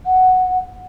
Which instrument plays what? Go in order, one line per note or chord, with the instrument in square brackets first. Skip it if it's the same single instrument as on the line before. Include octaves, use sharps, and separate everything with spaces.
[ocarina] F#5